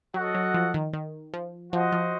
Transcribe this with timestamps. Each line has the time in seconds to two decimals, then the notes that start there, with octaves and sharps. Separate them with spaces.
0.14 F#3 F#4 A4 D#5 F#5
0.35 F#3
0.54 F3
0.74 D#3
0.93 D#3
1.34 F3
1.73 F3 F#4 C5 D#5 F#5
1.92 F3